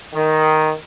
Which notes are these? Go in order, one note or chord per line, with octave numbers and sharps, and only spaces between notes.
D#3